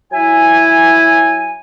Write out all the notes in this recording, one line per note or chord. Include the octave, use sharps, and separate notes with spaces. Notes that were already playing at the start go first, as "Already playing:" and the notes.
F#3 E4 E5 G#5